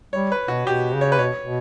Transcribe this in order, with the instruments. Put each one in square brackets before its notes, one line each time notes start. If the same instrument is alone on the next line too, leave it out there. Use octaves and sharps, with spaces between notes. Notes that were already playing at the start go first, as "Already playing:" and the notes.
[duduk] G3 [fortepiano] C#5
[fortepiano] B4
[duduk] B2 [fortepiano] F#4
[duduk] B2 [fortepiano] G4
[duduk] C#3
[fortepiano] C#5
B4
[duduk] B2 [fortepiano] C#5
[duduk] B2